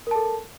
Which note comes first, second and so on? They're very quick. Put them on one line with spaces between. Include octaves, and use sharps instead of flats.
A#4 A5 A4